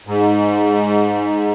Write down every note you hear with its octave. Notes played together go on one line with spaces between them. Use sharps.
G#2